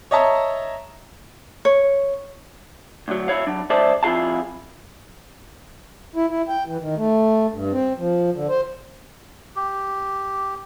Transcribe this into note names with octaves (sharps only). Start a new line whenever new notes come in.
C#5 D#5 E5 A5 A#5
C#5
D2 F#3
E4 C#5 F5
F#3 D4
C#2 G#4 C5 D5 E5 A5
F2 E4 F4 G#4 F5 A5
E4
E4
G5
E3
D#3
A3
G2
C4
F3
D3
C5
G4